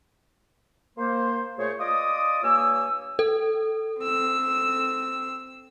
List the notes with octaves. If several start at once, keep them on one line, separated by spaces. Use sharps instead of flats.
A#3 C5
A#2 A3 G#4 C5 C#5
F4 D5 D#5 D6 D#6
G2 A#3 C#5 G#5 E6
A4
C4 E6